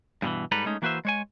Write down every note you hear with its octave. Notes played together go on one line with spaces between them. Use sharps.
G2 B2 D3 E3
G#2 G3 A4 B4 A#5
G#3 A3 C#4 D#4
E3 A#3 F#4 B4 C5 E5
G#3 C#5 G#5